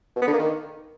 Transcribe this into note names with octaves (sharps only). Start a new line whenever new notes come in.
B2
B3
D3
A#3
D#3